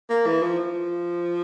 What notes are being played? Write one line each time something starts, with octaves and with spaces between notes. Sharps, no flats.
A#3
E3
F3
F3